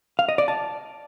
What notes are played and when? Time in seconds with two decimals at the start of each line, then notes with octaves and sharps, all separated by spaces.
0.19 F5
0.29 D#5
0.38 D5
0.48 A5